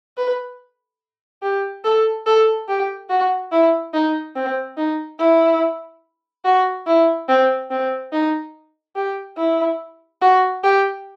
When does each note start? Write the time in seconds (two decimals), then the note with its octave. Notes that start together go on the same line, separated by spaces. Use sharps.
0.17 B4
1.43 G4
1.84 A4
2.26 A4
2.68 G4
3.10 F#4
3.52 E4
3.94 D#4
4.36 C4
4.77 D#4
5.19 E4
6.45 F#4
6.87 E4
7.29 C4
7.71 C4
8.13 D#4
8.96 G4
9.38 E4
10.22 F#4
10.63 G4